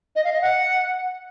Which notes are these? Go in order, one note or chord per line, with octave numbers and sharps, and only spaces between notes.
D#5
F5
D#5
F#5